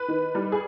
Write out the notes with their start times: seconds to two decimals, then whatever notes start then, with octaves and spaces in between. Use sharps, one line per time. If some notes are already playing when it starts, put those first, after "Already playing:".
Already playing: B4
0.08 D#3
0.35 G3
0.52 G#4